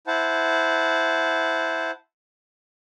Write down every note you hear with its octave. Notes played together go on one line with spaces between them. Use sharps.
E4 C5 F#5 A5